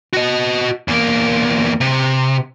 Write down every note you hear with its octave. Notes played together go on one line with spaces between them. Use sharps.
F#4 D#5
E2 A#3
C3